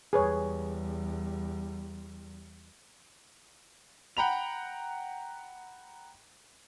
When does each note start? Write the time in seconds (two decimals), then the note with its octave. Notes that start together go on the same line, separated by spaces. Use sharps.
0.13 E2 G3 G#4 B4 C#5
4.17 F#5 G5 A#5 B5 F7